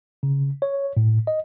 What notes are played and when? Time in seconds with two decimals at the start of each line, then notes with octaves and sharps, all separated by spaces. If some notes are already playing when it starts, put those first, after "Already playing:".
0.23 C#3
0.62 C#5
0.97 A2
1.27 D#5